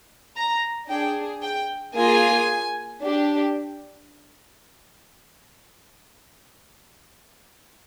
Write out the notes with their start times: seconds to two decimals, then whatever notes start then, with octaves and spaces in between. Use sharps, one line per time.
0.36 A#5
0.89 D4 G#4 G5
1.42 G5
1.95 A#3 F4 G#4 G#5
3.01 D4 G4